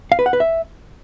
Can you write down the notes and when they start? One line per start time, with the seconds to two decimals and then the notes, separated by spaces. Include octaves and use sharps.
0.12 F5
0.19 B4
0.26 F#5
0.33 B4
0.40 E5